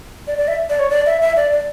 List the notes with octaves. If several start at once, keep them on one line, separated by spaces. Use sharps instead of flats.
D5
D5
E5
D5
C#5
D5
E5
E5
D5
D5